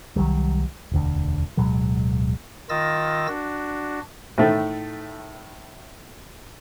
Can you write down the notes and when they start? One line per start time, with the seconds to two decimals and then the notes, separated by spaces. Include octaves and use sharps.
0.16 C2 D#3 F#3 G3
0.92 E1 D2 D3
1.57 D1 B2 F#3 G#3
2.69 D#3 F4 D#5 E6 A6 A#6
3.28 D4 F#4
4.38 A2 D#3 A3